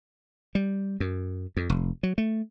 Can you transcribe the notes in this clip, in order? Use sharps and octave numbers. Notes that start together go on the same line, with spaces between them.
G3
F#2
F2
F1
F#3
A3